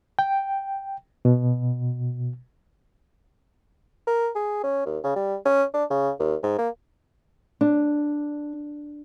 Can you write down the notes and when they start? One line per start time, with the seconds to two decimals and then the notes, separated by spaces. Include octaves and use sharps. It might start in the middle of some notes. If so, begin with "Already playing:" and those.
0.19 G5
1.25 B2
4.07 A#4
4.36 G#4
4.63 C#4
4.86 D#2
5.04 C#3
5.16 G3
5.45 C#4
5.74 D4
5.90 C#3
6.20 D#2
6.43 G#2
6.59 A#3
7.61 D4